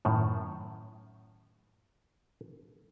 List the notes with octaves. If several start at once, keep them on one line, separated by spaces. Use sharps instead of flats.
F#2 A2 D#3